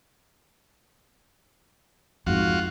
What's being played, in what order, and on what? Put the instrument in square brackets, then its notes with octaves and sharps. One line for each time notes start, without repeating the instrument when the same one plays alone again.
[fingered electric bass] F2 G#2 [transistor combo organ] F4 F#4